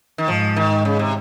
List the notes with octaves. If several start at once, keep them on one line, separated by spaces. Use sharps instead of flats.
D#3
G#2 F3
D#3
C#3
C3